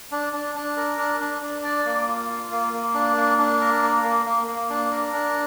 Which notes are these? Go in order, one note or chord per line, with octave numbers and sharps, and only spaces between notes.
D4
D4
D4
A#4
D4
D4
D4
D5
A#3
F4
F4
A#3
A#3
D4
A#3
D4
A#4
A#3
A#3
A#3
A#3
D4
A#4
D4